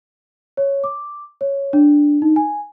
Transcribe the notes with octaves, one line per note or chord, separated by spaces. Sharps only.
C#5
D6
C#5
D4
D#4
G#5